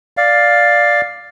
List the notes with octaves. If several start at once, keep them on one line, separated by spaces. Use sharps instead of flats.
D5 F5